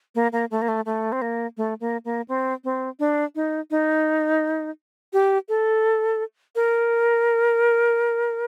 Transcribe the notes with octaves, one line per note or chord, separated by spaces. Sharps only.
A#3
A#3
A3
A#3
A3
A3
C4
A#3
A3
A#3
A#3
C4
C4
D4
D#4
D#4
G4
A4
A#4